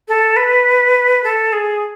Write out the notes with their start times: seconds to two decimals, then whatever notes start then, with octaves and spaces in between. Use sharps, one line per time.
0.08 A4
0.36 B4
1.24 A4
1.52 G#4